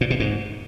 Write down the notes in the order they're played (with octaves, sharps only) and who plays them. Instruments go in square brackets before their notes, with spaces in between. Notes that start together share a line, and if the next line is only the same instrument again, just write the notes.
[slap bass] A#2
B2
G#2